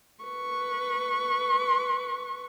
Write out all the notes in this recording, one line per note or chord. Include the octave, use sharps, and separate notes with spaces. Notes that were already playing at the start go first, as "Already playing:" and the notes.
B4 C#6